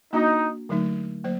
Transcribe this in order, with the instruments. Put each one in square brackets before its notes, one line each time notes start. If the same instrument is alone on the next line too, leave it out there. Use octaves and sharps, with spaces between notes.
[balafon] A#3 D4 F#4 [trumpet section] D#4
[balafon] D3 F#3 A3 D#4
F#3 A#3 C5